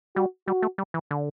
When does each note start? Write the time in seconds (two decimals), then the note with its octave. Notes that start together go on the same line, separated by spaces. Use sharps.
0.16 G3 F#4
0.48 G3 F#4
0.62 A3
0.78 G3
0.94 E3
1.11 D3